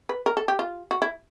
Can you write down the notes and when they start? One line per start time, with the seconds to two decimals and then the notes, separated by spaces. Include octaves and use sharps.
0.09 B4
0.26 A#4
0.37 A4
0.48 G4
0.59 F4
0.91 F#4
1.02 E4